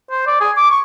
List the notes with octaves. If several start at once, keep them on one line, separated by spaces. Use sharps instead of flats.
C5
D5
G#4
D6
C#6